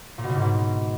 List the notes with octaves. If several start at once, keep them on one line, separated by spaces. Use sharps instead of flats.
A#2
B2
C#3
G#2
B2